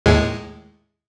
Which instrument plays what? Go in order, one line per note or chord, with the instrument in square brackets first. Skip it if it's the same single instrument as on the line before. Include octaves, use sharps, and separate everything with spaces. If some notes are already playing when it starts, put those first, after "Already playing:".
[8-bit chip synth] D#2 A2 G#3